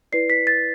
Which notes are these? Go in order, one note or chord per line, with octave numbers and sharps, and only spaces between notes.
E4 B4 D5 C7
B6
A6